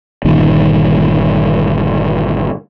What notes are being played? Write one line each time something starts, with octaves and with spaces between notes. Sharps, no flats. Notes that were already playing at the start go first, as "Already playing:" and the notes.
G1 A#2 D#3 G3